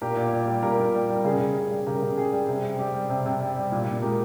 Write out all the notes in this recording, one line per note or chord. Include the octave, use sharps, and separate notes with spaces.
A#2 G4 A#4
A#2
G3
G3
A#2 G4 A#4
A#2
G3
G3
A#4
C#3 G#4
C#3
G3
G3
C#3 G4 A#4
C#3
G3 G#4
G3
C3
C3
G3 G4
G3
C3
C3
G3
G3
A#2
A#2
G#3 G4 A#4